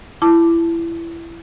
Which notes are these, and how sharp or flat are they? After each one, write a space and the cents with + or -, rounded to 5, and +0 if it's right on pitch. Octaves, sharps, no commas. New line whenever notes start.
E4 +20 A5 +0 D6 +0